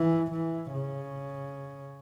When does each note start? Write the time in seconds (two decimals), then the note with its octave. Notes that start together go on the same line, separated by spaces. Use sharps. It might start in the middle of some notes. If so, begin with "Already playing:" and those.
Already playing: E3
0.31 E3
0.73 C#3